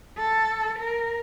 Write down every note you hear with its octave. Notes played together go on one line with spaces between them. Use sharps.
A4
A#4